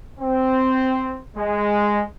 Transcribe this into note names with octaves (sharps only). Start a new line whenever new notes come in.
C4
G#3